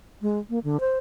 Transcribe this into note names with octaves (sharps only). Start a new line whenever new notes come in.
G#3
A#3
D3
C5